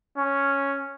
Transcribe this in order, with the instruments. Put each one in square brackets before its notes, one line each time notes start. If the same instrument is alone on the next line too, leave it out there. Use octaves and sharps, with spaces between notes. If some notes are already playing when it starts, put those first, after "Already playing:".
[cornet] C#4